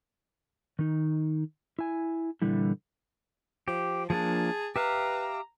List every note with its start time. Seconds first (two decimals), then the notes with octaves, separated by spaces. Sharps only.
0.79 D#3 D#4
1.79 E4 G#5
2.42 A#2 D3 E3 G3 E4
3.68 F3 G4
4.10 F3 A#3 D4 G#4 A5
4.76 G4 B4 E5 F5 A#5